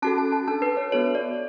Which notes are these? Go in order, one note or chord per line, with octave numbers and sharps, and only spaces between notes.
C#4 F#4 A4 A5
A5
A5
D4 A4 A5
B4
C#5
B3 D4 F#4 A4 C#5
D5